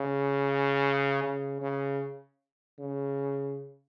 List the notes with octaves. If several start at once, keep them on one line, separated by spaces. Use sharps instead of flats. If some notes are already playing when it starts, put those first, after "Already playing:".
Already playing: C#3
C#3
C#3
C#3